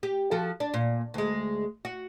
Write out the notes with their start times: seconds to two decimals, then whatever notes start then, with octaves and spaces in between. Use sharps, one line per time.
0.03 G4
0.31 F3 F#4 A4
0.60 D4
0.74 A#2
1.14 D2 G#3
1.85 F#4